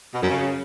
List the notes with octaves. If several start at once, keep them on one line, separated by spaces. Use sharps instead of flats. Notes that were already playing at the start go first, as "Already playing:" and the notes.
B2
F#2
C#3